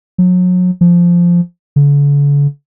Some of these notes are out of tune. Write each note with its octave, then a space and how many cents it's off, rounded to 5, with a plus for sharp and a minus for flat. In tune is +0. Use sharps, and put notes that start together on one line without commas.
F#3 -35
F3 -5
D3 -45